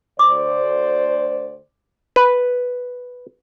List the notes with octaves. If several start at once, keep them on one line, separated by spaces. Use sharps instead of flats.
D2 C5 D5 D6
B4